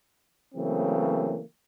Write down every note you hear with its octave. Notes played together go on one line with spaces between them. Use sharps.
C#3 E3 F#3 A3 A#3 C4